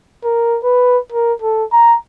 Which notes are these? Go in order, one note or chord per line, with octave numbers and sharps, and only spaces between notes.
A#4
B4
A#4
A4
A#5